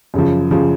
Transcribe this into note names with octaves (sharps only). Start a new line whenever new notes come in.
F#2 C#3 F3
C#3 F3